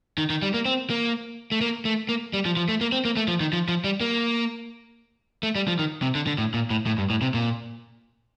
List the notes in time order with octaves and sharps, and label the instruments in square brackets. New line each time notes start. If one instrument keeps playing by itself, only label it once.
[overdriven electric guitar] D#3
D#3
G3
A#3
C4
A#3
A3
A#3
A3
A#3
G3
F3
F3
A3
A#3
C4
A#3
A3
F3
D#3
F3
F3
G3
A#3
A3
G3
F3
D#3
C3
D3
D3
A2
A#2
A2
A2
G2
A2
C3
A#2